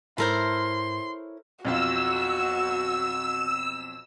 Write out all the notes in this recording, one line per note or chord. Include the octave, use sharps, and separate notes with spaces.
G#2 E4 A4 A#4 C5 C#5 C6
B1 F2 F4 F#4 E6